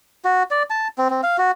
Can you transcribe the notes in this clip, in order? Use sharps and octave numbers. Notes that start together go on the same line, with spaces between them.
F#4
D5
A5
C4
C4
F5
F#4